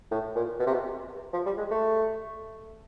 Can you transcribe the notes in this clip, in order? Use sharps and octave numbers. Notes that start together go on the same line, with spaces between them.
A2
A#2
B2
C3
B2
F3
G3
G#3
A3